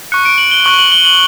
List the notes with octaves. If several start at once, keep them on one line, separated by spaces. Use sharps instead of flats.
C#6 F#6 C#7
D7
F#7
G7
C#6 F#6 F#7
F#7
G7
F#7